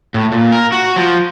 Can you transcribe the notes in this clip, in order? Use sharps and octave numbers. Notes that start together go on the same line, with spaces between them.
A2
A#2
A#4
F#4
F3